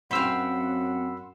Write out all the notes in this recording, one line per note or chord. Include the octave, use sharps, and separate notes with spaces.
F#2 C4 F5 F#5 B5 C6 E6